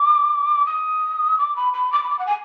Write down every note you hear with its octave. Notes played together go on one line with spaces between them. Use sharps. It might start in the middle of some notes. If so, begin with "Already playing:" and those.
Already playing: D6
D#6
D6
B5
B5
D6
B5
D6
F#5
G#5